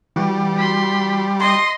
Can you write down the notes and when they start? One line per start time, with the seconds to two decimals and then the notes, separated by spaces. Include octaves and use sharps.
0.16 E3 G3 F#4
0.57 B5 C6
1.41 D#5 C6